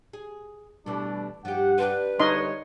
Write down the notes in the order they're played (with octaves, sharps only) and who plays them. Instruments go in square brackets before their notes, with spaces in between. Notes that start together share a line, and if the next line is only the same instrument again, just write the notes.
[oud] G#4
[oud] B2 E3 A3 [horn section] G3 D4
[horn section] G2 F#5 [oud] F3 G4
[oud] C4 D4 G4 [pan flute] B4
[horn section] D3 G3 C#5 [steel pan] D#4 D#5 C6